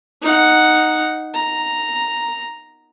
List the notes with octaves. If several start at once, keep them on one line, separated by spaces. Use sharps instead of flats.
D#4 F#5
A#5